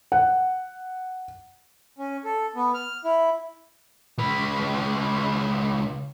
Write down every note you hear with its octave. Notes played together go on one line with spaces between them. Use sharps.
F#5
C#4
A4
B3
F6
E4
C#2 B4